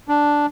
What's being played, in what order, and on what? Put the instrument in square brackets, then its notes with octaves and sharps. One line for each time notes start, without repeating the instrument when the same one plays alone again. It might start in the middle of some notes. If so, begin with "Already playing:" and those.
[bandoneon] D4